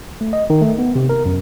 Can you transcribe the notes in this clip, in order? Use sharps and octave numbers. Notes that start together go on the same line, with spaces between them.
A3
D#5
D#3
A3
B3
C3
A#4
F#2